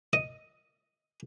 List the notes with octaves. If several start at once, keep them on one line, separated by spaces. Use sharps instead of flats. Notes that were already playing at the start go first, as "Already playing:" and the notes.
D#5